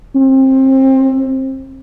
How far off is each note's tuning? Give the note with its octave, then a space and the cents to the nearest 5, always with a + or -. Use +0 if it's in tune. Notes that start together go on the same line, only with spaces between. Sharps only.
C4 +25